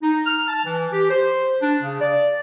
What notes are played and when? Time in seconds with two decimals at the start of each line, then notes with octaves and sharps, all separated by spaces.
0.02 D#4
0.25 F6
0.47 A5
0.65 E3
0.92 G4
1.09 C5
1.62 D4
1.82 C#3
1.99 D5